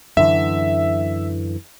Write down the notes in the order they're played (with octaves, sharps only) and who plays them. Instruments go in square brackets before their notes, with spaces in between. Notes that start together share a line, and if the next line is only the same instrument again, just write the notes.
[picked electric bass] F#2 D3 E3 [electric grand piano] E5